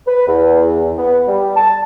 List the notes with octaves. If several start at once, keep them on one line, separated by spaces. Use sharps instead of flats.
B4
E2
B3
G3
A5